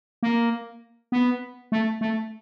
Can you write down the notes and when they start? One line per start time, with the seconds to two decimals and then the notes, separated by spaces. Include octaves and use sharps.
0.23 A#3
1.12 B3
1.72 A3
2.01 A3